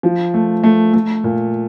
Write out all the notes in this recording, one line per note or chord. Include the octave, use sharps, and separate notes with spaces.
F3
A3
A3
A3
A#2